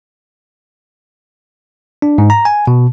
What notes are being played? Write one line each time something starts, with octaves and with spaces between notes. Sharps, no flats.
D4
G#2
A#5
G#5
B2